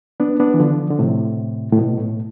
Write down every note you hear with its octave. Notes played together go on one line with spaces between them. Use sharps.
B3 D4
B3 D4
E3
D3 F3
D3
A2 C3
A2
B2
A2